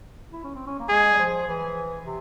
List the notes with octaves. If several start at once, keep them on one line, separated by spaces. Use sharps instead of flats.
E4
C#4
C4
C#4
A#3
G#3 G#4
G3
F3
E3
C3